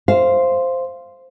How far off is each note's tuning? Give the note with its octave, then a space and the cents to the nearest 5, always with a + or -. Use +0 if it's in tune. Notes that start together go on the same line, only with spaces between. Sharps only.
C5 +0 F5 -10